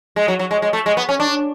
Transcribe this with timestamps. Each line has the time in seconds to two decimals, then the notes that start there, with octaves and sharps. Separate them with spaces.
0.16 G#3
0.28 F#3
0.39 F#3
0.51 G#3
0.62 G#3
0.73 A3
0.86 G#3
0.97 B3
1.09 C#4
1.20 D4